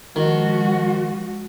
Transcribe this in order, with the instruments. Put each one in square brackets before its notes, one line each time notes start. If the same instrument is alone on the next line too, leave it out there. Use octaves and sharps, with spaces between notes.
[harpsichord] D#3 [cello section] F3 G#3 F#4